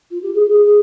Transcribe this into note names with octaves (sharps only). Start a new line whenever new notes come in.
F4
G4
G#4
G#4
G#4